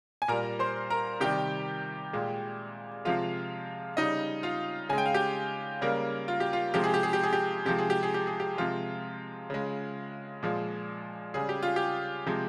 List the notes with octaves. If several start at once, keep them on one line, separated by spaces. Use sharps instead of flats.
G#5
A#2 G3 A#4 A#5
C5 C6
A#4 A#5
C3 D#3 G3 G4 G5
A#2 G#3
C3 F3 G#3 F4 F5
C#3 G3 D#4 D#5
F4 F5
C#3 G#3 G#5
G5
F5
G4 G5
C#3 G3 A#3 A#4
F4
G4
F4
C3 F3 G#3 G4
G#4
G4
G#4
G4
G#4
G4
C3 F3 G#3 G4
G#4
G4
G#4
G4
G#4
G4
C3 F3 G#3 F4
C#3 G#3
A#2 F3 G#3
C#3 G3 G#4
G4
F4
G4
C3 F3 G#3